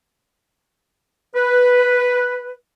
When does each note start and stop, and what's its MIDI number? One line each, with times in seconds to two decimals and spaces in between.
1.36 2.52 71